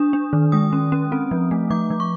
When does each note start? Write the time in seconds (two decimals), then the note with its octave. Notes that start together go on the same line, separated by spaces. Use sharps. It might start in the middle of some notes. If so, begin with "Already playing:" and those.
Already playing: D4 D#6
0.13 D4
0.33 D#3
0.52 G#3 D#6
0.73 C#4
0.92 C#4
1.12 C4
1.31 F3
1.51 A3
1.70 F3 D6
1.90 F3
2.00 C#6